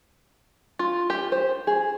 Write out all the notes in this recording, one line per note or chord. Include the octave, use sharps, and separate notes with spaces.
F4
G4
C5
G#4